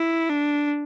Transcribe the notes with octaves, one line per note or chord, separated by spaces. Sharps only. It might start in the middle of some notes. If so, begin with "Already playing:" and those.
Already playing: E4
D4